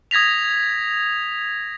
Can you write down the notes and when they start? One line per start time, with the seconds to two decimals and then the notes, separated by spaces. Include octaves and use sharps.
0.11 D#6 G#6 A#6 B6 F7